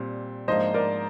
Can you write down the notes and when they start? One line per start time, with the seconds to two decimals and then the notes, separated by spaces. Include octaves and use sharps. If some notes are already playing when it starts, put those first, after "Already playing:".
Already playing: A#2 G3 C4
0.48 G#2 F3 A#3 D4 C5 D#5
0.74 A#4 D5